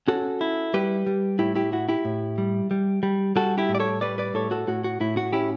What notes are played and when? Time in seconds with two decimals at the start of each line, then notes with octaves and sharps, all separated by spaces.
0.08 C#4 F#4 A4
0.41 E4
0.74 G3 G4 B4
1.07 G3
1.39 A2 E4 G4
1.55 E4 G4
1.72 E4 F#4
1.89 E4 G4
2.05 A2
2.38 G3
2.71 G3
3.03 G3
3.36 G3 F#4 A4
3.58 E4 G4
3.69 A2
3.75 D5
3.80 A4 C#5
4.01 G3 B4 D5
4.18 B4 D5
4.34 A2 A4 C#5
4.51 F#4 A4
4.67 A2 F#4
4.84 F#4
5.00 A2 E4
5.17 F#4
5.33 C#4 E4 G4